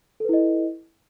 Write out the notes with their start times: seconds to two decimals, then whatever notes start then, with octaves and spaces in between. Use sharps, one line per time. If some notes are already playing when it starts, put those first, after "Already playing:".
0.20 A4
0.25 B4
0.29 E4
0.33 D#5